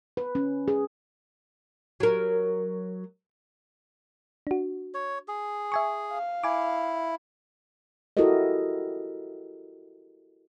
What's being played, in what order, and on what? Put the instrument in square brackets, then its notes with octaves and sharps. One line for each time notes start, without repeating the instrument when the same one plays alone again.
[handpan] B4
C#4
G#4
[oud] F#3 A#4
[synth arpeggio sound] D4 F#4
[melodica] C#5
G#4
[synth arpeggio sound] E5 G#5 C#6
[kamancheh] F5
[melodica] E4 [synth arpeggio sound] G#5 D6
[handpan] E4 F#4 G4 A4 A#4 D#5